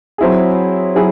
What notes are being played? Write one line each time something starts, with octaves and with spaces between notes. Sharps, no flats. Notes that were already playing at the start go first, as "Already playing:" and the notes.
F#3 C4 E4 G#4
F#3 C4 E4 G#4